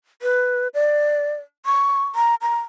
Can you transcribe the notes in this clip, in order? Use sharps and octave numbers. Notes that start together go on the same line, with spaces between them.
B4
D5
C#6
A#5
A#5